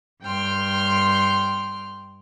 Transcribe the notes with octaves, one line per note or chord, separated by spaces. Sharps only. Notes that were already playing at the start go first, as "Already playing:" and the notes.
G2 G5 C6 F6